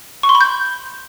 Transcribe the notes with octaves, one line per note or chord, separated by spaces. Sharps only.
C#6
C6
B5
G6